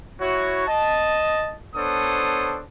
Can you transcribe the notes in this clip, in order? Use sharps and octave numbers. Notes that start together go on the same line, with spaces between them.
E4 F#4 C#5
D#5 A5
B3 D4 A4 C5 C#5 D#6